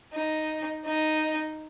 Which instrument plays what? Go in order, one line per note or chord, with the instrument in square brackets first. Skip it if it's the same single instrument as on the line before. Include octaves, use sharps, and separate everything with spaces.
[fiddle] D#4
D#4